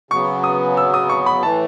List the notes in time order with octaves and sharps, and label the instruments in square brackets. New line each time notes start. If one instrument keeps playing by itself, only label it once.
[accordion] C#3 F#3 B3 [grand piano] C#6
[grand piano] D#6
E6
D#6
C#6
B5
[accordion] A2 E3 A3 [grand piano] A5